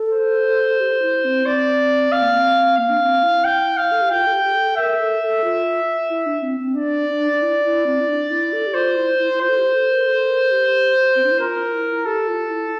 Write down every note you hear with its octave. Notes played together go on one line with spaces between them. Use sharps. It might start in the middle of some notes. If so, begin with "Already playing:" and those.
Already playing: A4
C5
G4
E4
C4
C4 D5
C4 F5
A#3
C4
A#3 F5
D4
C4
E4
G5
F5
A4
G4
F4 G5
A4
G4
G4
A4
A#4 E5
A4
A4
F4
E4
D4
C4
C4
D4 D5
D4
D4
E4
E4
C4
E4
D4
E4
A4
G4
F4 C5
E4
E4
E4
F4 C5
A4
G4
A4
A#4
A4
A#4
G4
C4
D4
E4
F4 A#4
E4
G4 A4
F4
E4